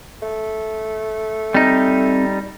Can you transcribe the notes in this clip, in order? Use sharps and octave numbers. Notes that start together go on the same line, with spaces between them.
A3
G3 C4 D#4